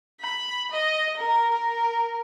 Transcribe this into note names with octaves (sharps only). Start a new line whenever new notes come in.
B5
D#5
A#4
A#4